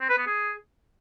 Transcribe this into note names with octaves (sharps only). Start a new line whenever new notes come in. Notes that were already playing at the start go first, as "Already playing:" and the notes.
C4
B4
B3
G#4